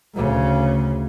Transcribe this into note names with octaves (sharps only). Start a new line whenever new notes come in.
D2 C#3